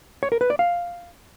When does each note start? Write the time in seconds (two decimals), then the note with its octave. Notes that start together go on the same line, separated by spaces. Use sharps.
0.23 C#5
0.32 A#4
0.41 B4
0.50 D5
0.59 F5